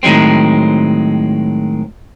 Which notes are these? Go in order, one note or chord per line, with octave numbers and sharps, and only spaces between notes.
A2 D#3 F#3 G#3 C4